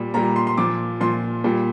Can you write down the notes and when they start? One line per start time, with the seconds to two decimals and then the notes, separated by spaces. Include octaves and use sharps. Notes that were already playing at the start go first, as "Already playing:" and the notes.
Already playing: A#2 G3
0.14 A#2 G3 A#5
0.36 C6
0.47 C6
0.58 A#2 F3 D6
1.01 A#2 F3 C6
1.44 A#2 G3